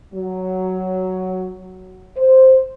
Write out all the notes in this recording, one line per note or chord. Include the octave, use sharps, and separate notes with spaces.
F#3
C5